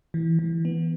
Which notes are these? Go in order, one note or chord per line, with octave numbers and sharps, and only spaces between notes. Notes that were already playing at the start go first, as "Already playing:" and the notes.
E3
E3
B3